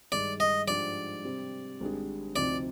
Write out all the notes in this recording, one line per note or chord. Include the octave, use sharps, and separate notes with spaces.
G2 D#3 G#3 D5
D#5
G#2 F3 G#3 D4 G4 D5
C3 G3 C4
G#1 G#2 G3 D4 G#4
D2 C3 F3 C4 D#4 D5